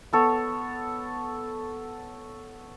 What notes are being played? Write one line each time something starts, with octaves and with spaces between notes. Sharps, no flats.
B3 A4 C#5